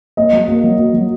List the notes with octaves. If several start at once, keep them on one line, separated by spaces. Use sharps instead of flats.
A#3 D#5
F#3
A#3
F#3
A#3
F#3